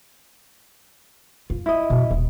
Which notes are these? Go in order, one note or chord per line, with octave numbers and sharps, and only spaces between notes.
F4
E4 D#5
B2
D#1